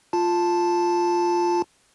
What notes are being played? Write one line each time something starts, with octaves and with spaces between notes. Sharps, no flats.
F4 A5